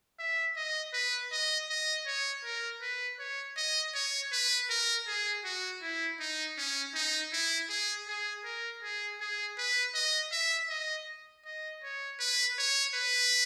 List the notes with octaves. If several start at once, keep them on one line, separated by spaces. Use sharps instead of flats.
E5
D#5
B4
D#5
D#5
C#5
A#4
B4
C#5
D#5
C#5
B4
A#4
G#4
F#4
E4
D#4
C#4
D#4
E4
G#4
G#4
A#4
G#4
G#4
B4
D#5
E5
D#5
D#5
C#5
B4
C#5
B4